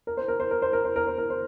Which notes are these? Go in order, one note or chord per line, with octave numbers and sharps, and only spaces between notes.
A#4
C5
A#4
C5
A#4
C5
A#4
C5
A#4
C5
A#4
C5